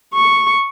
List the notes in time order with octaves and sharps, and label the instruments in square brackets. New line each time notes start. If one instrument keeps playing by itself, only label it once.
[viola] C#6